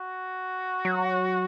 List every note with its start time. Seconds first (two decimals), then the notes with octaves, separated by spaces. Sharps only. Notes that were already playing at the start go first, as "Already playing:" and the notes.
Already playing: F#4
0.85 F#3